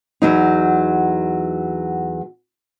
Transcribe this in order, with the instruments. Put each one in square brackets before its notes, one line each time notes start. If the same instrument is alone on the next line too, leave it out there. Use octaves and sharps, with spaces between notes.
[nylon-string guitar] E2 F#3 D#4